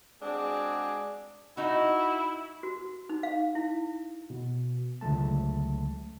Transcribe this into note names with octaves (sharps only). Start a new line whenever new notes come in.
G#3 C4 D4 F#4 G#4
D#4 E4 F#4
F#4
D#4
F5
E4
B2
C#2 D3 F#3 A3 A5